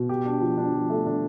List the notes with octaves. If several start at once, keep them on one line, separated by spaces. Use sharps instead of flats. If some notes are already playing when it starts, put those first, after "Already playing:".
Already playing: B2
G4
D4
F3
D4
F3
A3
D4